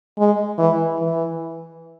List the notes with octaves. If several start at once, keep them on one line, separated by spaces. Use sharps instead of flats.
G#3
E3
E3